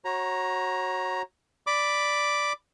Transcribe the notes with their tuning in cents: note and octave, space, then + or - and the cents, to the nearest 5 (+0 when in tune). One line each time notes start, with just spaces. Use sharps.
F#4 +0 C#5 -25 A#5 +10
D5 +0 B5 +0 D6 +0